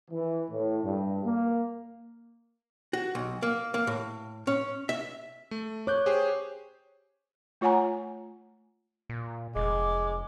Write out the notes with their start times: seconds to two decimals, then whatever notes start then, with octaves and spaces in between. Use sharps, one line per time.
0.11 E3
0.51 A2
0.83 G2
1.24 A#3
2.93 F#4
3.15 B1
3.42 A#3
3.74 A#3
3.87 A2
4.47 C#4
4.89 E5
5.51 A3
5.87 C#5 D6 F#6 G6
6.06 G4 G#4 C5
7.61 A3 F4 C#5 F#5 G#5 A#5
9.09 A#2
9.55 F1 G#3 D6